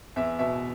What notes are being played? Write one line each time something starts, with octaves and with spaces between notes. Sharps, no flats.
E2 E5
B2 E5